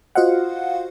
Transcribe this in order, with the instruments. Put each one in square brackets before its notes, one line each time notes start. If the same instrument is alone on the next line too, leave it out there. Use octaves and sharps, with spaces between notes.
[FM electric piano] F4 F#4 C5 D#5 F5 F#5